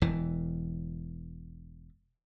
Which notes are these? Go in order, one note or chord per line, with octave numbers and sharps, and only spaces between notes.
E1 E3